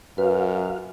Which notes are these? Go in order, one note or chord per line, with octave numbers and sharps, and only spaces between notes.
F#2 F#4 B4 F5